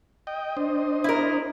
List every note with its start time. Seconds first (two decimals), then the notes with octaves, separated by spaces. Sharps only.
0.27 D#5 G5
0.57 D4 C5 D#5
1.04 E4 A#4